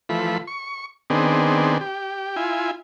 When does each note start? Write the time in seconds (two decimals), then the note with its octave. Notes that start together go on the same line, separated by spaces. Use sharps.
0.09 E3 F3 A3 B5
0.47 C#6
1.10 D#3 B3 C4 D4 G#4
1.81 G4
2.36 E4 F4 G#5